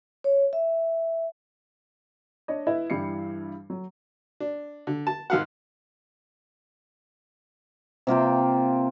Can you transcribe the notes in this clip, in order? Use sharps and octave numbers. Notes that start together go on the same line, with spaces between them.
C#5
E5
D4 C#5 D#5
E4 B4 D#5 E5
G2 E3 G3 E4 C7 C#7
F#3
D4
D3
A5
G#1 F5 F#5
C3 A#3 F4 G5